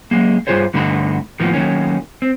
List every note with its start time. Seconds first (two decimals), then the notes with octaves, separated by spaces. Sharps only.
0.11 F#3 G#3 A#3
0.47 G2 F#3 F4 G#4 C5 C#5
0.74 G2 D3 A3 D#4 F#4 B5
1.39 D#2 A2 D#3 F3 A#3 B3
1.53 D#3 F#3 A#3 C#4
2.22 C4